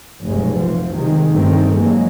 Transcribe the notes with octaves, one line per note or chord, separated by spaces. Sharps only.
F1 B1 F#2 G#3
E3 F3
F1 C3 D#3 G#3
G1 G2 D#3 A3 C4
E3 F#3 G#3 A#3